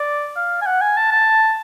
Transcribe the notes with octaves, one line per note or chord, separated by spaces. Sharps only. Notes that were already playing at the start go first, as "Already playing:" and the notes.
Already playing: D5
F5
G#5
F#5
G#5
A5
A5